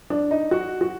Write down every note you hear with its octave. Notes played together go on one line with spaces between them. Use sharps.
D4
D#4
F#4
F#4